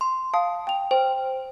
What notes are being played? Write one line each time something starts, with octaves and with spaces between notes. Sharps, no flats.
C6
F5 A5 D#6
G5 F7
C5 G5